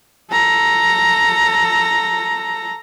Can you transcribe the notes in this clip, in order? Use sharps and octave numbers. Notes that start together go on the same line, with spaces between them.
A4 A#5